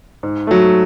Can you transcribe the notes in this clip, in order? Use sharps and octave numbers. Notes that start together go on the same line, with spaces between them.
G#2
F#3 A3